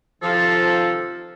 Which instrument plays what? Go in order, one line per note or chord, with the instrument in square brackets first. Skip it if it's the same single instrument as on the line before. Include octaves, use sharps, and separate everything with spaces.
[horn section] C3 D#3 F3 [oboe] A4